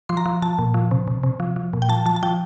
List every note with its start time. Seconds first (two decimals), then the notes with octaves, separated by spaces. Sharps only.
0.09 F3 C6
0.17 A#5
0.26 F3
0.42 F3 A5
0.59 A#2
0.74 F3
0.91 C3
1.08 C3
1.23 C3
1.40 F3
1.56 F3
1.73 A#2
1.82 G5
1.89 F3 A5
2.06 F3 A5
2.16 A5
2.23 F3 G5